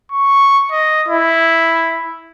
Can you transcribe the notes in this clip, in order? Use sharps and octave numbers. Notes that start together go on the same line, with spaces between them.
C#6
D#5
E4